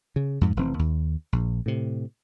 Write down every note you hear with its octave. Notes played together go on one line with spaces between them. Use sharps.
C#3
F2 G#2
F1 E3 C4
D#2
A#1
A2 C3